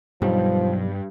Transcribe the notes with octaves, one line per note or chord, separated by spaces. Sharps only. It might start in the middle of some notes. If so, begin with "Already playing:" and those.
B1 G2 F3 G3